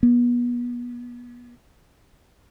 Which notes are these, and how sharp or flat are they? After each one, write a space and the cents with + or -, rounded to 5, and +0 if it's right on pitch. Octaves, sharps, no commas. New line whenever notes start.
B3 -30